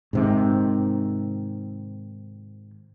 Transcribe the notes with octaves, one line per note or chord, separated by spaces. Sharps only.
G#2 C3 D#3